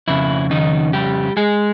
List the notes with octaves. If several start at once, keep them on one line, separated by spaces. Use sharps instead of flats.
F2 C#3 E4
D#3 D#4
G3 G4
G#3 G#4